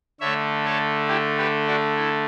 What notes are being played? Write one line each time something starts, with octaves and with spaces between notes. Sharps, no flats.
D3 A3 C#5 E5
A4 C#5
E4 G4
G4 B4
D4 F#4
E4